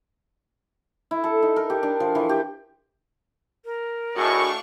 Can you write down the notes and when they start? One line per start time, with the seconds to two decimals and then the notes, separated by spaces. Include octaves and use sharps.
1.11 E4
1.24 A4
1.42 D#4
1.56 A#4
1.70 G4
1.83 D4
2.00 F3
2.15 E3
2.29 G4
3.65 A#4
4.16 A2 D4 F#4 G#4 D#5 F5 C#6